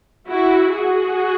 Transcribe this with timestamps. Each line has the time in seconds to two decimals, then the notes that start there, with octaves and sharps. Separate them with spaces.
0.28 E4 F#4
0.73 F#4 G#4